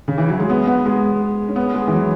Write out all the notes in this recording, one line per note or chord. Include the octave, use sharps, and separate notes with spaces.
C#3
E3
F#3
G#3
B3
B3
G#3
C#4
B3
G#3
E3
F#3